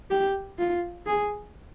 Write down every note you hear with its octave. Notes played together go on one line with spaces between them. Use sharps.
G4
F4
G#4